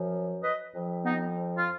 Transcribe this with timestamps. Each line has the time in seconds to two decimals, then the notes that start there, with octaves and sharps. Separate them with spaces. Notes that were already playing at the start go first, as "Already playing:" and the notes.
Already playing: F#2 F3
0.42 B4 D#5
0.73 F2 F3
1.04 B3 D#4
1.56 F4